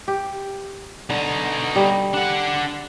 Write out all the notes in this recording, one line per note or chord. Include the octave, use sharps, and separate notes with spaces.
G4
B2 D3 D#4
G3
D4 F#5